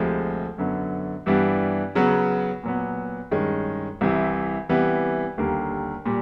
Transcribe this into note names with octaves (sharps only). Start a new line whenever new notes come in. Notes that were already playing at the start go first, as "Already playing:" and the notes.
Already playing: D2 C3 F3 G#3
F#2 D3 F#3 B3
G2 E3 G3 B3 D4
C#3 F#3 B3
A#2 F#3 B3
G2 D#3 G#3 C#4
C2 C3 E3
C3 E3 G3 B3
D#2 D3 G3 A#3
A#2 G3